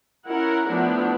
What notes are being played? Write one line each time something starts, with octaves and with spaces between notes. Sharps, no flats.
C#4 E4 A#4 F#5
F3 A3 B3 D4 E4